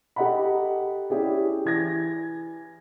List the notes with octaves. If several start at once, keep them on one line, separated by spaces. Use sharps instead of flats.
G4 A4 D#5 F#5 A#5 B5
C#4 E4 G4 G#4 D5
E3 G#6 A#6